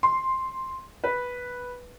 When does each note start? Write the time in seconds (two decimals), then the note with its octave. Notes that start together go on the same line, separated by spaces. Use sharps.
0.03 C6
1.04 B4